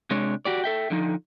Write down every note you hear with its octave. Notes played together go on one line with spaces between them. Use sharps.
C3 G#3 D4 C#5
F#4 G4 D5
A4 E5 G5
D3 F3 D#4